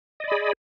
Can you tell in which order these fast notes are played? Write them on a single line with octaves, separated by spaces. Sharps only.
D#5 D5 B5 G#4